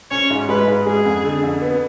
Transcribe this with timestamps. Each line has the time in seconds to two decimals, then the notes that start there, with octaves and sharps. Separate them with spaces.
0.11 C#4 C#5
0.30 G#2
0.49 G#3 B4
0.67 G#2
0.86 G#3 G#4
1.06 F2
1.24 D3
1.43 F2
1.61 B3